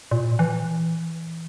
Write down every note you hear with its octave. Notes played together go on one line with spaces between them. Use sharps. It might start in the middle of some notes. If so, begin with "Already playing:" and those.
A#2
E3